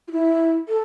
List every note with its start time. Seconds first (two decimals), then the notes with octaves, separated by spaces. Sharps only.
0.08 F4
0.11 E4
0.68 A4